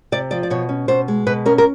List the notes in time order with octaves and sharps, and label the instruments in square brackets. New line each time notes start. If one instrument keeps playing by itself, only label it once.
[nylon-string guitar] C3 D5
F3 D5
D5
B2 C#5
C#4
B2 C5
G#3
B2 B4
C#4 A#4
A#4